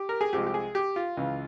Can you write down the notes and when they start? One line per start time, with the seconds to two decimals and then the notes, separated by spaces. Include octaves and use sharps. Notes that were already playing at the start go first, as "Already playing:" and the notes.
Already playing: G4
0.09 A#4
0.21 G#4
0.33 C2 C3 F3 G#3 G4
0.46 G4
0.54 G#4
0.75 G4
0.96 F4
1.17 C#2 C#3 E3